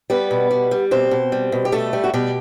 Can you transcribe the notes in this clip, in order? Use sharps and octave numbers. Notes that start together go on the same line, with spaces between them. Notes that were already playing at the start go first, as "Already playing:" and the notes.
G3 B3 B4
B2
G3
G3
B2 C4 C5
B2
G3
B2
G4
G3 A3 A4
G3
F#4
B2 G3 G4